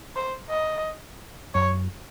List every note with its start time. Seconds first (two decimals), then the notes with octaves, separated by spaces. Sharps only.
0.16 C5
0.50 D#5
1.54 F#2 C#5